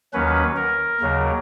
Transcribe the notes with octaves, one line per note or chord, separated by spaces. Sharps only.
D#2 D#3 F#3 C#4 B4
A#4
D#2 C#3 F#3